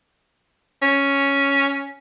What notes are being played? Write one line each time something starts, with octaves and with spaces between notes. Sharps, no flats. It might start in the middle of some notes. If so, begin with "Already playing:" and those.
C#4